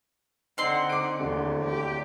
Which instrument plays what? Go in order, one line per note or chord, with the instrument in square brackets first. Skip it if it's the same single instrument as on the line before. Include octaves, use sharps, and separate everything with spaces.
[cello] D3 F#5 [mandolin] C4 C6 [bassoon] D#4
[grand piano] D6 D7
[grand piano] D1 [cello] D#2 [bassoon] D3
[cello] G4 D5